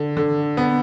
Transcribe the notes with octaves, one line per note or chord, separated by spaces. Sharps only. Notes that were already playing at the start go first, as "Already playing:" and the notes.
Already playing: D3
D3
B3